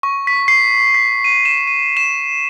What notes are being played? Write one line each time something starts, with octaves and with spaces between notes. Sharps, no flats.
C#6
B6
C7
B6
D#7
E7
D#7
E7